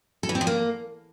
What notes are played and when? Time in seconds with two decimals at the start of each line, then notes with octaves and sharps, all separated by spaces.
0.23 A4
0.29 E3
0.35 C4
0.41 F3
0.47 A#3